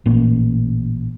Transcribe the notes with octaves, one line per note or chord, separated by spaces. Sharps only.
A1 A#2